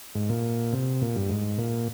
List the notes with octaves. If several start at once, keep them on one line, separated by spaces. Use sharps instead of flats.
G#2
A#2
C3
A#2
G2
G#2
A#2